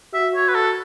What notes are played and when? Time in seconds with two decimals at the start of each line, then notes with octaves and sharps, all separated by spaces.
0.13 F#4 E5
0.35 C#5
0.48 B4
0.55 A4